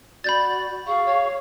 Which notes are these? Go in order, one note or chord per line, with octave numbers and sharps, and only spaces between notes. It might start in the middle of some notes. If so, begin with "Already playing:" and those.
F#4 D5 B5 G6 A6
G#4 F5 C#6
C#5